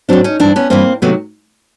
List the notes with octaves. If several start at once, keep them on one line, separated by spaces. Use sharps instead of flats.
A2 F#3 C4 D4
C#4 D#4
G2 E3 C4 D4
B3 C#4
G2 E3 A#3 C4
C3 D#3 F#3 A3 B3